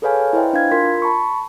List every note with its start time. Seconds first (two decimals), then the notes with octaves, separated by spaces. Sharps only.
0.02 G#4 A4 B4 C#5 F5 G#5
0.33 E4 B4 C5 D#5 G5
0.53 D4 F5 G#6
0.71 F4 A#4 C6 B6
1.02 A5 B5 C#6